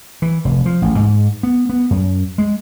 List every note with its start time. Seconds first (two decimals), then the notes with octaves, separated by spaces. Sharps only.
0.22 E3
0.45 F1
0.66 F3
0.82 A1
1.00 G#2
1.43 B3
1.69 B3
1.91 F#2
2.38 G#3